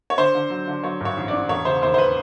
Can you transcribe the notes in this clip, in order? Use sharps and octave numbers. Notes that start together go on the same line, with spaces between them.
C#5
D3 C5
D3
F#3
D3
F#3 C#5
G2 C#5
A1
D5
A1
E1 C#5
C#3 C5
D#2 C5
C5
B4